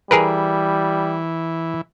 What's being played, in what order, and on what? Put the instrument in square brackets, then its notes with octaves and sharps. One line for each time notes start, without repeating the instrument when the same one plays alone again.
[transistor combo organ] E3 [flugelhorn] G3 [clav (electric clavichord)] G#4 A#4 B4